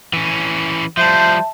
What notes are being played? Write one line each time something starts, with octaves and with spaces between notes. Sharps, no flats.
E3 C#4
F3 G3 C5 E5 A5